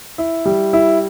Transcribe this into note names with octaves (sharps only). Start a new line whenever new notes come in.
E4
G3
E4